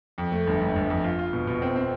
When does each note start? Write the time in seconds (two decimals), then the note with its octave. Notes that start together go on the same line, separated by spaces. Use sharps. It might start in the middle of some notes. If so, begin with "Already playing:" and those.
0.18 F2
0.32 A3
0.47 G1
0.61 G1
0.76 G1
0.90 F2
1.04 F4
1.19 F4
1.33 B2
1.47 B2
1.62 C4
1.76 C4